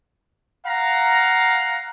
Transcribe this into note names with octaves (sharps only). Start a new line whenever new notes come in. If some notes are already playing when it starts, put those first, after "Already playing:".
F5 F#5 A#5